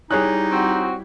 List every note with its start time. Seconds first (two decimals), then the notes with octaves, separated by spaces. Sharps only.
0.11 G3 D#4 E4 G#4 C#5 F#6
0.52 C4 F#4